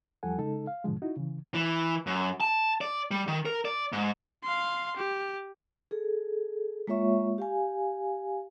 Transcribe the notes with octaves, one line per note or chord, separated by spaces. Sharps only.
E2 F3 G3 A4 F#5 G#5
C#3 G#3 D#4 A4
F5
G#2 B2 D3 F3 G#3
D#4 E4 F#4
C#3 E3
E3
F#2
A5
D5
G3
D#3
A#4
D5
G#2
F5 C6
G4
G#4 A4
G#3 A#3 F4 C#5 E5 C#6
G4 F5 G#5